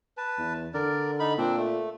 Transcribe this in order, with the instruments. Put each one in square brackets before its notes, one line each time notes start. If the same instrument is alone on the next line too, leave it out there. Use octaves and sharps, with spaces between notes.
[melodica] B4 A5
[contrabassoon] E2
[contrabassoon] D3 [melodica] A#4 D5
[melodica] D#4 B5
[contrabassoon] A#2 [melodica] C4 D4
[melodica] A3